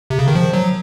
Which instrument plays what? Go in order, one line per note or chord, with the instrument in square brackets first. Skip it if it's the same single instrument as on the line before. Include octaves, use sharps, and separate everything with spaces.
[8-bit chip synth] C3
C#3
D#3
F3
F#3